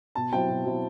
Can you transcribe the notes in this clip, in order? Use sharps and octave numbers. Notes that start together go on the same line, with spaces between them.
B2 A5
F#3 C4 E4 G5
B2
F#3 C4 E4